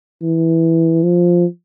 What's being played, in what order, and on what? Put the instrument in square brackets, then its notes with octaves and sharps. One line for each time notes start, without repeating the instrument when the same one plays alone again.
[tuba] E3
F3